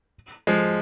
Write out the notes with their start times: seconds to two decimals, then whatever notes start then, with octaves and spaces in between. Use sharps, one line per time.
0.47 F3 G#3